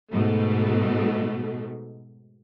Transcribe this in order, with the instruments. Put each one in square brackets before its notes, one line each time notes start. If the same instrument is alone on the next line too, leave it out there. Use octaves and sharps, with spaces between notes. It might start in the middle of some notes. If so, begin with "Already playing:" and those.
[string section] G#2 B2 A3